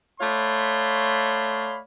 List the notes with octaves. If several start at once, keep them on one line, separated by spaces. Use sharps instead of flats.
A3 C#5 D5 F5 B5 C6